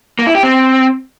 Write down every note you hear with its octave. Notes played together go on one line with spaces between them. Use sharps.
A#3
E4
G4
C4